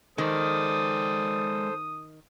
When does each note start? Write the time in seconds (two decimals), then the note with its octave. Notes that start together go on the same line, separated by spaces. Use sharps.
0.18 D#3 G#3 A4 C5 D5 D#6